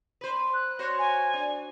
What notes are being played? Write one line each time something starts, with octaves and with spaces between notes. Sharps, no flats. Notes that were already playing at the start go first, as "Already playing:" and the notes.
B4 C5
F#6
F#4 C5 C#5
G#5
D4